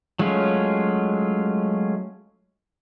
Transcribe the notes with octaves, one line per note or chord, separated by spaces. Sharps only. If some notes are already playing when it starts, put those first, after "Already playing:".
F#3 G#3 A3 C#4 F4